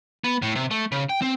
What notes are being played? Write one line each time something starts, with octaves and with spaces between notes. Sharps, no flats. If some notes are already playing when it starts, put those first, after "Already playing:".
B3
A2
C3
A3
C#3
G5
C4